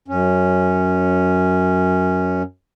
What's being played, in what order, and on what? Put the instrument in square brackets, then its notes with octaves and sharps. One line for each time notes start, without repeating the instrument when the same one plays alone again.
[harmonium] F#2 C#4